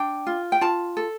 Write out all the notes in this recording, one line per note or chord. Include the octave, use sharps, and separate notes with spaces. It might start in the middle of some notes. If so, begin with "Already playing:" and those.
Already playing: D4 G5
F4
G5
F4 A5
A4